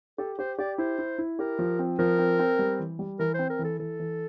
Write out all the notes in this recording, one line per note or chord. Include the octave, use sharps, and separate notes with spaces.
G4 A4
G4 C5
G4 D5
E4 C5
E4
E4
G4 A#4
F3
C4
F3 A#4
C4
C4
G3
E3
G3
E3 A#4
C4 C5
A#4
E3
A4
E3 A4
E3